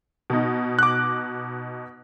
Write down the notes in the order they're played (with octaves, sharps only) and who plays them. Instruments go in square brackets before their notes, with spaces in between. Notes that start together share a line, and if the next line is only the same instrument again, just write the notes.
[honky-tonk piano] B2 D#4
[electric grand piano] D6 F#6